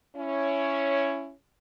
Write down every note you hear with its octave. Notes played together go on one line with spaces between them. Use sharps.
C#4 E4 C#5